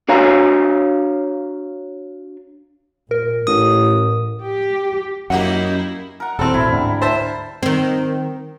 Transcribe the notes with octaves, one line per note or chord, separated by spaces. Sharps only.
D4 F#4 C#5 F5 G#5 A#5
A#2 A#4
A1 A2 D#6
G4
F#2 F#3 A#3 D#4 E4 G4 F#5
A#4 F#5
D#1 G3 C4 A4
A1 B2 E4
D2 G#2 D4
C5 E5 A5
D#3 C4